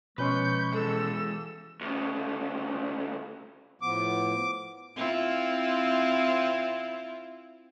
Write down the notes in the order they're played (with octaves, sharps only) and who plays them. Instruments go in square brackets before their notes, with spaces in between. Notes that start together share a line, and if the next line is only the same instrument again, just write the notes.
[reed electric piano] B2 C#4 C6 [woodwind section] F3 G#3 C#6 [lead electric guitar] B4 [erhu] G6
[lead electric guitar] E3 G#3 [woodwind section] A4 [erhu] E6
[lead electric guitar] D2 C#3
[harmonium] A2 F3 B3 [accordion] D6
[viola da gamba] C4 E4 F4